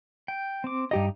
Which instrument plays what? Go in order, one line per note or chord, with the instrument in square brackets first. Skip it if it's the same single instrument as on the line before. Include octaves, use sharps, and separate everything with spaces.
[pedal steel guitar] G5
C4 D6
[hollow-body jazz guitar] G2 G4 D#5 [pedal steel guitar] D#4